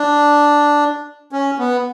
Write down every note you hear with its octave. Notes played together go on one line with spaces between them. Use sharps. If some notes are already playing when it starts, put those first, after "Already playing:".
Already playing: D4
C#4
B3